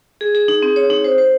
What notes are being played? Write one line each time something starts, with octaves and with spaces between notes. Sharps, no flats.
G#4
G#4
D#4
C4
C#5
D#4
C5
C5